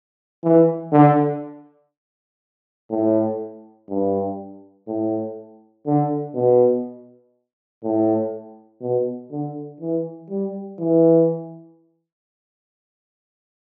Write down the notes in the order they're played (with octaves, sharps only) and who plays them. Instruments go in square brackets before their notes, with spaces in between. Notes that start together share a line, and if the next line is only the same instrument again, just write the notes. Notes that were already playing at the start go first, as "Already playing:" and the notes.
[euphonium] E3
D3
A2
G2
A2
D3
B2
A2
B2
D3
E3
G3
E3